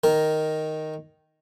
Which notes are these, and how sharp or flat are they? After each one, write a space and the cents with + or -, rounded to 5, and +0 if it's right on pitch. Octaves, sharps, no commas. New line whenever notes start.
D#3 +0 A#4 +0